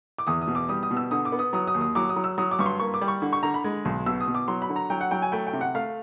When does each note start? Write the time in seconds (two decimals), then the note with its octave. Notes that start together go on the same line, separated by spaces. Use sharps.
0.18 D6
0.27 E2 D#6
0.42 D#6
0.48 B2
0.55 D6
0.69 G3 D#6
0.83 D#6
0.91 B2
0.97 E6
1.11 D3 D#6
1.25 D6
1.32 B3
1.39 D#6
1.53 F#3 D#6
1.67 D#6
1.74 D#2
1.81 D#6
1.95 F#3 D6
2.09 D#6
2.16 F#3
2.24 E6
2.38 F#3 D#6
2.51 D6
2.59 G2 C#6
2.66 C6
2.80 A#3 C#6
2.94 D6
3.01 G3
3.08 C#6
3.22 D3
3.33 C#6
3.43 D3 A#5
3.54 B5
3.64 G#3
3.85 B1
4.06 B2 E6
4.20 D#6
4.27 B2
4.35 D6
4.48 F#3 C6
4.62 B5
4.69 D3
4.76 A#5
4.90 F#3 G5
5.01 F#5
5.11 F#3 G5
5.22 G#5
5.32 A3 G5
5.47 G5
5.53 C3
5.61 F#5
5.75 A3 F5